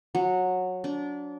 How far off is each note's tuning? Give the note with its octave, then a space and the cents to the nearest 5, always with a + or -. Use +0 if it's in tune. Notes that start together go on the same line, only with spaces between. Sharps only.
F#3 -15
D4 -25